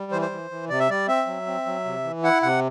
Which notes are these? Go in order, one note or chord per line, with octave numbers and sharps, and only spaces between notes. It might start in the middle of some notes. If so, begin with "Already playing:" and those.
Already playing: G3
E3 C5
C5
E3
E3
C3 D5
E5
G3 D5
C4 E5
F#3
C4
F#3
C3
E3
E4 F#5
C3 F#5